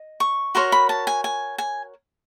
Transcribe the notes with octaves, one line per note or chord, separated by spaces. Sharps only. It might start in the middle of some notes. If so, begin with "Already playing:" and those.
Already playing: D#5
C#6
F#4 A#4 C#5 C6
B5
A5
G#5
G#5
G#5